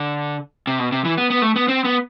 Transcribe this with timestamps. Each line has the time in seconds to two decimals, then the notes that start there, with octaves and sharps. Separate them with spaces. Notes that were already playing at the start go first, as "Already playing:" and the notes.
Already playing: D3
0.67 C3
0.79 B2
0.92 C3
1.05 E3
1.17 B3
1.30 B3
1.42 A3
1.56 B3
1.68 C4
1.85 B3